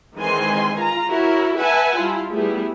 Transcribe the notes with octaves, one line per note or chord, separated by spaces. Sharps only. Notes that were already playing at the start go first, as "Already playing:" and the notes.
D#3 E3 G#3 C4 G#5 C6
F4 A#5
E4 F#4 A#4 C#5
B4 E5 F#5 G#5 A5
G3 E4 F4
G3 A3 B3 E4 G#4